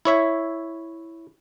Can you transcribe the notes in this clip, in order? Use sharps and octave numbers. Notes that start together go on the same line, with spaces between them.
E4 C#5 E5